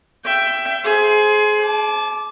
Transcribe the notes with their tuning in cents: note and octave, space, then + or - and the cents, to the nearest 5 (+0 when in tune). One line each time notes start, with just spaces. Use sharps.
E5 +15 G5 +0
G#4 +25 C5 +0
A5 -30 D6 +0